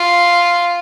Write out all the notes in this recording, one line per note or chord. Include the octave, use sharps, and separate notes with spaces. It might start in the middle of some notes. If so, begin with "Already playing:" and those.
Already playing: F4